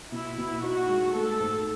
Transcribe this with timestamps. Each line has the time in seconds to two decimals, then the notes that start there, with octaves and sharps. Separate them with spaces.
0.12 B2 E4
0.38 B2
0.63 D#4 F#4
0.89 G#3
1.14 A3 A4
1.40 G#2